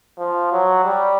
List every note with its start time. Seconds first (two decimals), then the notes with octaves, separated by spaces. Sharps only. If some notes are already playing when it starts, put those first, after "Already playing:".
0.18 F3
0.52 F#3
0.85 G3